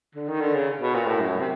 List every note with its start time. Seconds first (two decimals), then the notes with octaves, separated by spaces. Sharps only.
0.15 D3
0.28 D#3
0.41 D3
0.55 C#3
0.81 B2
0.95 A#2
1.07 A2
1.20 F#2
1.40 C3